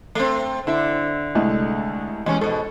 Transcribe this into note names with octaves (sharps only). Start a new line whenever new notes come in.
A3 C4
D3 E4 E5
C2 G#3 A3
E2 G3 G#3 C#4
G#2 B2 A4